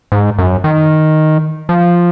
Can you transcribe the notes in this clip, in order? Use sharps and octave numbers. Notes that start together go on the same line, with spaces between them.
G#2
F#2
D#3
F3